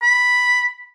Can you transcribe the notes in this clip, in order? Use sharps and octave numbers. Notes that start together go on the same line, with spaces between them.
B5